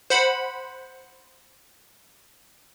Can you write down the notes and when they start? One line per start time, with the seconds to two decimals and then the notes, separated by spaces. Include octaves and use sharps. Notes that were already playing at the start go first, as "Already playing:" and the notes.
0.10 C5 F#5 B5